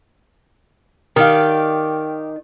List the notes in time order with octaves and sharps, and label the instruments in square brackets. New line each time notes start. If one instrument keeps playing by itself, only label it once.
[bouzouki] D#3 [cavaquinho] G4 D5 F5